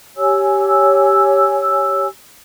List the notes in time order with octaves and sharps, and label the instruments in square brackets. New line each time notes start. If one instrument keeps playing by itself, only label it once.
[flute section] G4 C#5 G#5 E6